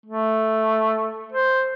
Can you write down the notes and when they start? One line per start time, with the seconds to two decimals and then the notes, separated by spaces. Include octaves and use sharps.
0.06 A3
1.33 C5